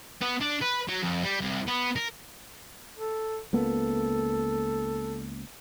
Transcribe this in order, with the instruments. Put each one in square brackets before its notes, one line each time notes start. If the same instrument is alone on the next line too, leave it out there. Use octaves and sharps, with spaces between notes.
[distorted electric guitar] B3
D4
B4
F#3
F2
G3
C2
B3
A#4
[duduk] A4
[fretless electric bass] C#2 A#3 B3 [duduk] A4